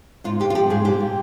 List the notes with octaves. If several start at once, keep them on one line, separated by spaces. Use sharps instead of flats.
G#2 F4
A#3 G4
F4
F3 G4
G#2 G#4
A#2 G4
A#2